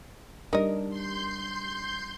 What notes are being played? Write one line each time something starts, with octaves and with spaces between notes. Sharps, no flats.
G3 D4 D#4 A#4 D#5
C6 G6